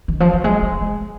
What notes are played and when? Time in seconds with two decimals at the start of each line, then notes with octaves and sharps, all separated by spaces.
0.08 D#3
0.20 F3
0.33 F#3
0.44 G#3
0.62 G#3
0.81 G#3